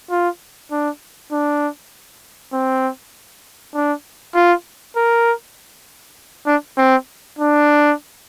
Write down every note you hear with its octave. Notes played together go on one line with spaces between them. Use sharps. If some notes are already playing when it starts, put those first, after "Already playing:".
F4
D4
D4
C4
D4
F4
A#4
D4
C4
D4